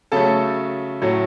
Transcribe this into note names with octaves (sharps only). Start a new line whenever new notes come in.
C#3 F#3 A3 A4 A5
A2 F#3 A3